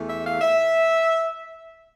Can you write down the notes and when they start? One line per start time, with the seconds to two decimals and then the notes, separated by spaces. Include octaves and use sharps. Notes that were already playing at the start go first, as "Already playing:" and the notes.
Already playing: E2 E3 A3
0.08 E5
0.25 F5
0.41 E5